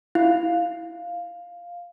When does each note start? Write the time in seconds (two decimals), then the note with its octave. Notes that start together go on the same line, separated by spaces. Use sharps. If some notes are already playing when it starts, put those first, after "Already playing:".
0.15 E4 F5